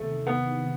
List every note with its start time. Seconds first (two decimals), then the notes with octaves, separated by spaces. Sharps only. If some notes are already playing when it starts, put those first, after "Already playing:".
Already playing: E2 C3 D#3 A3
0.27 B3